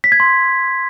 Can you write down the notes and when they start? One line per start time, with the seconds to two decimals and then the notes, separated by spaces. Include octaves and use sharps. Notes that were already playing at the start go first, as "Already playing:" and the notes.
0.04 B6
0.12 G#6
0.20 C6